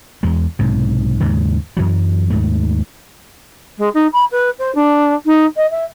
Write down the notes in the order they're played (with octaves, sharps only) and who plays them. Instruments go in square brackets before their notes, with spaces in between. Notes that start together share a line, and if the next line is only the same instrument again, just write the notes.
[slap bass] E2 G#3
B1 G#2 C3
D#2 G#2 C#3 G#3
F#2 E3 F#3
D#2 G#2 A3
[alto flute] G#3
D#4
B5
B4
C5
D4
D#4
D#5
E5